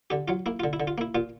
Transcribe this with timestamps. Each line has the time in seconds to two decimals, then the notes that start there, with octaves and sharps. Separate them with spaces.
0.10 D3 G4
0.28 F#3 F4
0.46 A#3 E4
0.60 D3 F4
0.73 E4
0.80 D3
0.87 F4
0.98 A#3 E4
1.15 A#2 F4